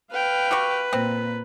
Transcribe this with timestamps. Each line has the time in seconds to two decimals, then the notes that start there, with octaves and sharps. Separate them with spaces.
0.12 B4 F5 G5 F6
0.51 F#4 G4 C#6
0.93 A#2 C4